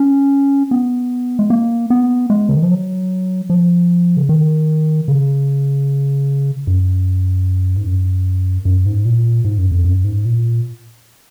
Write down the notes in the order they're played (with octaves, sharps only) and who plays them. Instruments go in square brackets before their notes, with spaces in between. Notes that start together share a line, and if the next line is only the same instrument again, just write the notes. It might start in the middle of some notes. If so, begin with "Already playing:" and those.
Already playing: [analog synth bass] C#4
B3
G#3
A#3
B3
G#3
C#3
D#3
F3
F#3
F3
C#3
D#3
C#3
F#2
G#2
F#2
F#2
G#2
A#2
G#2
F#2
F2
F#2
G#2
A#2